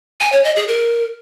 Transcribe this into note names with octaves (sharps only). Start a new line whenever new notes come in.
G#5
C#5
D#5
G#4
A#4